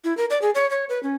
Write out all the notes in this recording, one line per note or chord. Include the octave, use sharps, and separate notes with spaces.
E4
A#4
D5
G#4
C#5
C#5
B4
C#4